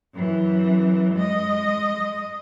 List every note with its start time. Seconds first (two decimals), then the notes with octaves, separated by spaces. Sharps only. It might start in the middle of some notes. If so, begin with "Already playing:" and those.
0.13 F#2 E3
1.14 G#3 D#5